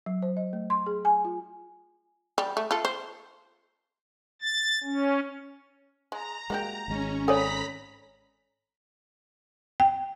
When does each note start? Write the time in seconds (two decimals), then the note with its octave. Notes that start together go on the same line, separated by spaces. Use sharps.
0.06 F#3
0.22 C5
0.37 D#5
0.53 A3
0.70 C6
0.86 G#4
1.05 G#5
1.25 F4
2.38 G3
2.57 A3
2.71 F4 A4
2.85 C5
4.42 A6
4.84 C#4
6.12 G#3 A#5
6.50 G#3 A#3 F#4 G4
6.88 G#1 G#3 C#4
7.28 C4 A4 C#5 D5 G#5 A#5 B5 B6
9.80 G5